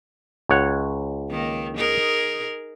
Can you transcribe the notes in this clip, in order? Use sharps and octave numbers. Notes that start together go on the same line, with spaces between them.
C#2 C#5 F#5
D#3 A#3
D#4 G#4 A#4